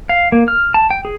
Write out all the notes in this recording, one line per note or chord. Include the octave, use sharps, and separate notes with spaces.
F5
A#3
F6
A5
G5
G#4